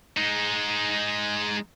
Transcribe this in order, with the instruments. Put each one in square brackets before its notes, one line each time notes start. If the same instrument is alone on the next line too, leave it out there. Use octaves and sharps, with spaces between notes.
[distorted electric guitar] G#3 D#4